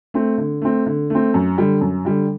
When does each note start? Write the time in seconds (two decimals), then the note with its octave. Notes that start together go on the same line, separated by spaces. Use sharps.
0.14 A3 C4
0.38 D3
0.62 A3 C4
0.86 D3
1.10 A3 C4
1.34 F#2
1.58 D3 G3
1.81 F#2
2.05 D3 G3